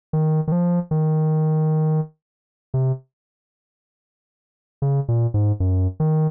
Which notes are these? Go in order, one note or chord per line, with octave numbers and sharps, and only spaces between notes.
D#3
D#3
F3
D#3
C3
C#3
A#2
G#2
F#2
D#3